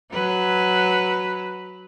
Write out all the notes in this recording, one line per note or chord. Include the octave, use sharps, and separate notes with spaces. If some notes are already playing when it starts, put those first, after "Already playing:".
F#3 B4